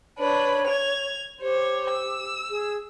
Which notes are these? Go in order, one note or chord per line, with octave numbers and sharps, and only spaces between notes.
D4 B4 C#5
G#6 F7
G4 C5 C#5
E6
G#4